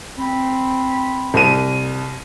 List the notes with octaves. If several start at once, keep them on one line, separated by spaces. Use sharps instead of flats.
C4 B5
C2 D#7